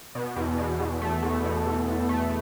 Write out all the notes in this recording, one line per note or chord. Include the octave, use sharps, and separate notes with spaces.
B2
E2
B2
E2
A3
E2
B2
E2
E2
A3